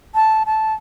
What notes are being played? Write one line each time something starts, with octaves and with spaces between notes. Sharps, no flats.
A5
A5